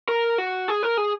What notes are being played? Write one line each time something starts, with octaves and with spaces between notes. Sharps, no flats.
A#4
F#4
G#4
A#4
G#4